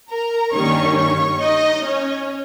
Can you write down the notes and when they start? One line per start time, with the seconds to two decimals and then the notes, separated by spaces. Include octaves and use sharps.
0.10 A#4 A#5
0.53 G2 D#3 G3 A#3 C#4 C#5 C#6
0.96 C#5 C#6
1.40 D#4 D#5
1.84 C#4 C#5